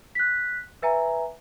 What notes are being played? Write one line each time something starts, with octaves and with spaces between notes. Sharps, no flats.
F#6 B6
B4 E5 G#5 A#5